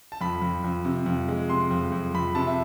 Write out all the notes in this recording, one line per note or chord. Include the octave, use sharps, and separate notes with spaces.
A5
F2 B5
F2
F2
C3
F2
G#3
C3 C6
F2
F2
F2 B5
C3 A5
E5